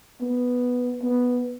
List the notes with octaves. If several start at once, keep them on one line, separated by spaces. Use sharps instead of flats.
B3
B3